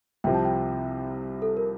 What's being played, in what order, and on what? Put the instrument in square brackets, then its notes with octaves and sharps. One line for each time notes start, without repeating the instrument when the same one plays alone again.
[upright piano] C2 C3 F3 C4 [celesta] G5
[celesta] A5
G5
A4
A#4